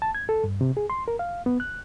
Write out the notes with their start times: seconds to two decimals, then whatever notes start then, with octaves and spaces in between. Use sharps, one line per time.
0.02 A5
0.15 G#6
0.29 A4
0.44 G2
0.61 C3
0.77 G#4
0.90 C6
1.08 A#4
1.19 F5
1.46 B3
1.60 F#6